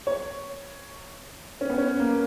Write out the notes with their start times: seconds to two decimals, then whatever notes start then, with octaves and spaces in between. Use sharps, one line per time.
0.07 C#5
1.61 C#4
1.70 B3
1.78 C#4
1.99 A#3